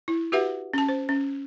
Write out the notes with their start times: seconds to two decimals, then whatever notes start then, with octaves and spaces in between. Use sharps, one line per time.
0.08 E4
0.32 F#4 G4 B4 E5 F#5
0.74 C#4 A5
0.89 C5
1.09 C#4